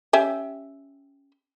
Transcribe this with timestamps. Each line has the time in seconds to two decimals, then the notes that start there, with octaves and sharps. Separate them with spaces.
0.13 C#4 G4 E5